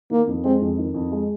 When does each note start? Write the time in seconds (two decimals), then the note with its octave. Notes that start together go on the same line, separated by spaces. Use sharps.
0.11 D#3 A#3
0.27 F2
0.44 G#3 C4
0.61 F2
0.78 D#3
0.94 F2
1.12 G#3